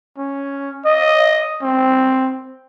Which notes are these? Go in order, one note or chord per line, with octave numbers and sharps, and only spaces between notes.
C#4
D#5
C4